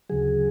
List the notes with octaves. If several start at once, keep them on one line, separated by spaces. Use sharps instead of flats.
D2 C#3 F#3 G#4